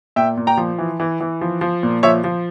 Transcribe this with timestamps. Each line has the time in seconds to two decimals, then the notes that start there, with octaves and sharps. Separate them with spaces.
0.16 A#2 E5 G5
0.37 A#2
0.47 G5 A#5
0.57 F3
0.78 E3
1.00 E3
1.21 E3
1.41 F3
1.61 F3
1.83 A#2
2.03 F3 C#5 E5
2.24 F3